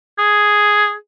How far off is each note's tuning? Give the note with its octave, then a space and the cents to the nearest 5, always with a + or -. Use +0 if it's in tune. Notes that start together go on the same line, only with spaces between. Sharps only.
G#4 +5